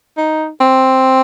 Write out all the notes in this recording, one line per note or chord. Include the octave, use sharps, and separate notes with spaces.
D#4
C4